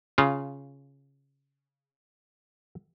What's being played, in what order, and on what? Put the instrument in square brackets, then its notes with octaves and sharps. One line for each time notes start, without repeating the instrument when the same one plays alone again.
[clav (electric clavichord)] C#3 F4